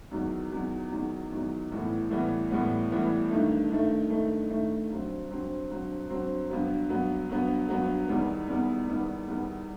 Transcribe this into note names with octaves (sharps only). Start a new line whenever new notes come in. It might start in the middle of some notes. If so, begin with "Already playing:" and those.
E2 D#3 F#3
E2 D#3 F#3
E2 D#3 F#3
E2 D#3 F#3
A2 E3 G3 B3
A2 E3 G3 B3
A2 E3 G3 B3
A2 E3 G3 B3
G2 D#3 A3
G2 D#3 A3
G2 D#3 A3
G2 D#3 A3
G2 F#3 C4
G2 F#3 C4
G2 F#3 C4
G2 F#3 C4
G2 F#3 B3
G2 F#3 B3
G2 F#3 B3
G2 F#3 B3
E2 D#3 G3 B3
E2 D#3 G3 B3
E2 D#3 G3 B3
E2 D#3 G3 B3